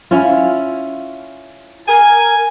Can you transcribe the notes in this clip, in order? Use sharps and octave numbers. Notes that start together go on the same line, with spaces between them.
C#4 E4 F4
A#4 G#5